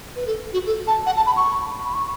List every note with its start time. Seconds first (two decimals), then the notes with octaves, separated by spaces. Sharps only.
0.16 B4
0.27 A4
0.53 F#4
0.66 A4
0.87 A5
1.06 F#5
1.17 A5
1.26 B5
1.37 C#6
1.85 B5
1.94 C#6